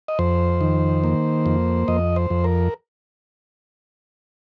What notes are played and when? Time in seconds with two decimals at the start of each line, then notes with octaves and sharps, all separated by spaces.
0.08 D#5
0.19 F2 C5
0.61 D#3
1.04 A#3
1.46 F2
1.88 F2 D#5
2.16 C5
2.30 F2
2.44 A#4